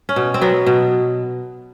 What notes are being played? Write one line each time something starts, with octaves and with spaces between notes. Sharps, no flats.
C#4
B2
C4
F#3 B3
B2